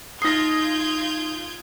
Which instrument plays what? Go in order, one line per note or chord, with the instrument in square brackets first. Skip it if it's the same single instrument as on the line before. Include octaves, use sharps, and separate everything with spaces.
[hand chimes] D#4 C7 [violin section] F4 G6 G#6 [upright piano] D#6 A#6